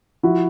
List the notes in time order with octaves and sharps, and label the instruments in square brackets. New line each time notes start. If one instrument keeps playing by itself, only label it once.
[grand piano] F3 E4 F#4